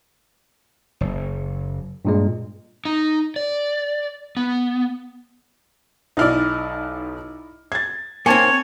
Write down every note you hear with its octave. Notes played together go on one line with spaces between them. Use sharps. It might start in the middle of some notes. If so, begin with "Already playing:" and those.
F#1
G2 A#2 G#3
D#4
D5
B3
B1 B2 D#4 E4 D5 F6
G#6 A6
A#3 C4 C#5 G#5 A5 C#7